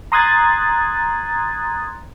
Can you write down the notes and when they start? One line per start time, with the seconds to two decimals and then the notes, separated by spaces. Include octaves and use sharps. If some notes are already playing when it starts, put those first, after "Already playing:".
0.12 A#5 C6 D#6 F#6 G#6 A6